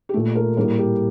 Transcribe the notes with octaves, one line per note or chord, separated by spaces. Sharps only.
G4
A#2 A3 A4
A#4
A2 G3 A#3 A#4
G4